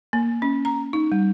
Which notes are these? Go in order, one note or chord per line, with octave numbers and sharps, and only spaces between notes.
A#3
C#4
A#5
D#4
G3